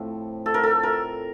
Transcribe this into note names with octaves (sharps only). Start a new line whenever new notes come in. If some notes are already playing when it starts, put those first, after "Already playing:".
Already playing: A2 F3 A3 C4
A4
A#4
A4
A#4